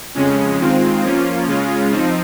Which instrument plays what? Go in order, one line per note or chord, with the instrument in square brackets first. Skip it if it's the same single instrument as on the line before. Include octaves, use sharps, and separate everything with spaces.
[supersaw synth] F2 C#3 G#3 C#4
D#3 G#3 C4 F4
F3 A#3 C#4 F4
C#3 G#3 C#4 F4
F3 C4 D#4